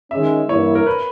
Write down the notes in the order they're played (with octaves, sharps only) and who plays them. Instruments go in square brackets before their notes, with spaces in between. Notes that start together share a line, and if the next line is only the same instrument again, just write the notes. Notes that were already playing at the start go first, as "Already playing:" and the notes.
[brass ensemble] D#3 G#3 C#4 [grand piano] E5
[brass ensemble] G2 E3 A#3 E4 [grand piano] C#5
[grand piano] A#4
B4